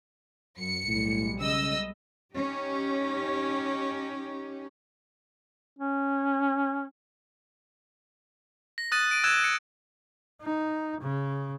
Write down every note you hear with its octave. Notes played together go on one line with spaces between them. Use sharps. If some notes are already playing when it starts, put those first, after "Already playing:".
F#2 C#7
B1 A2 G3 G#3
C#3 D#5 E6
C#4 D#4 G4
C#4
A#6
D#6 F#6 A6 D#7
D7 D#7
E6 F#6 G#6 E7
C#7
D#4
C#3